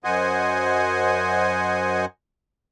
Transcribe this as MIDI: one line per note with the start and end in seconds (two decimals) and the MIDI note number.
0.04 2.05 42
0.04 2.05 72
0.04 2.05 75
0.04 2.05 78
0.04 2.05 80